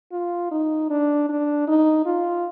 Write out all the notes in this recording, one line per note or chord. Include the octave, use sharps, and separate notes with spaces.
F4
D#4
D4
D4
D#4
F4